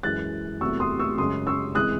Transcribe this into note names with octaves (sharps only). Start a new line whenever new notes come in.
F#2 E3 G#3 F#6 A6
E2 C3 F#3 A3 C#6 E6
C6 D#6
C#6 E6
F#2 C#3 G#3 C6 D#6
C#6 E6
C3 E3 G#3 D#6 F#6